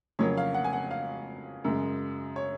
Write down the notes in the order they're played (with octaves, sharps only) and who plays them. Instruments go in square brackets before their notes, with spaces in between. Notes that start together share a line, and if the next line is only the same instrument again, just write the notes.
[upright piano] F2 C#3 F#3 A#3 C#5
F5
F#5
G#5
F#5
F5
F#2 C#3 G#3
C#5